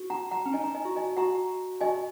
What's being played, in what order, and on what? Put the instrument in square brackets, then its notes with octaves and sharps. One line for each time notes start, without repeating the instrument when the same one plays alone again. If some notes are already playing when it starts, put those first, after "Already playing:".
Already playing: [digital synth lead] F#4
[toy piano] F#5 A#5
F#5 A#5
[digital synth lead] C#4
[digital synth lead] D#4 [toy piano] D#5 G#5
[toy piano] A#5
D#5 G#5
[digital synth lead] F#4
[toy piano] D#5 G#5
[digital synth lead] F#4 [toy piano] F#5 A#5
[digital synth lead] F#4 [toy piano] D#5 G#5